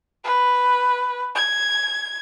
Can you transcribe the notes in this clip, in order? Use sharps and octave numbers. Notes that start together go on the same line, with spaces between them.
B4
G#6